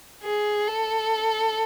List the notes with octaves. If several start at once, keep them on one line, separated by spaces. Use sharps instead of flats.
G#4
A4